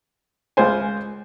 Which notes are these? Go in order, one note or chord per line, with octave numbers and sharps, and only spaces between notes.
C#2 F4 C5 G#5